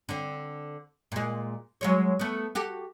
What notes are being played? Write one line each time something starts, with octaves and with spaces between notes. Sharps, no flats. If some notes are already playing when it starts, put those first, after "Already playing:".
D3 C4
A#2 G#3
F#3 G#3 C#5
A3 B3
F#4 G4 A4